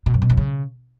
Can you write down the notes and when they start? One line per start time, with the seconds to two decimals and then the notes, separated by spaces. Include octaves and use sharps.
0.06 B2
0.14 F#2
0.22 B2
0.30 F#2
0.37 C#3